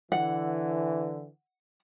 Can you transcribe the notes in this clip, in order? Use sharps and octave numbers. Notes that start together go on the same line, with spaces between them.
D3 E3 F#5